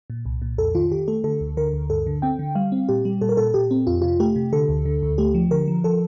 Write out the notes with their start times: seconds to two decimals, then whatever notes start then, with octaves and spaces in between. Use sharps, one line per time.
0.10 A#2
0.25 C2
0.42 A#2
0.58 F2 A4
0.75 D#3 F4
0.91 D#3 G4
1.08 A3 A4
1.24 D3 A4
1.41 D2
1.57 D3 A#4
1.73 D2
1.90 G2 A4
2.07 D3
2.22 C4 G5
2.39 D3
2.55 G3 F5
2.72 C4
2.89 A#2 G4
3.05 G3
3.21 A#2 A4
3.29 A#4
3.37 A#2 A4
3.54 A#2 G4
3.71 C4
3.87 F2 F4
4.02 C3 F4
4.20 A3 G4
4.36 C3
4.53 D3 A4
4.69 D2
4.85 D3
5.02 D2
5.18 A3 G4
5.35 F3
5.51 D3 A#4
5.68 F3
5.84 F3 A4